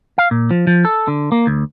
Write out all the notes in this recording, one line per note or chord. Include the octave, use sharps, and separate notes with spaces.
F5
A#2
F3
F3
A4
D3
A#3
D2